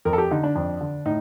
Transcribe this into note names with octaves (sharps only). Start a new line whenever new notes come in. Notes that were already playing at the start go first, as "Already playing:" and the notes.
F2 A#4
A4
G4
D3 D#4
D4
F2 D4
D3
A2 D#4